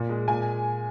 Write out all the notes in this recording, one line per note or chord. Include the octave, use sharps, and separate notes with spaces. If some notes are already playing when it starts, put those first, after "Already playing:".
Already playing: A#2
G#3
A#2 G#5